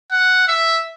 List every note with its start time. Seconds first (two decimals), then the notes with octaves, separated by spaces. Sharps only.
0.11 F#5
0.48 E5